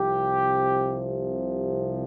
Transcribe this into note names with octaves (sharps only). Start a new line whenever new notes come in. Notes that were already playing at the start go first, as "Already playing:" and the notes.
Already playing: C2 C3 F3 G4